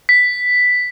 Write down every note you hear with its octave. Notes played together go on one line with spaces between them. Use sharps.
B6